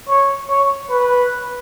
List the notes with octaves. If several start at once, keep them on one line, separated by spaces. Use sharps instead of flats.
C#5
C#5
B4